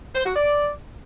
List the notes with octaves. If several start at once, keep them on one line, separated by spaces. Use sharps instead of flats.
C5
F#4
D5